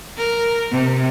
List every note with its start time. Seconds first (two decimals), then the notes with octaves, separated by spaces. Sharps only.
0.17 A#4
0.71 C3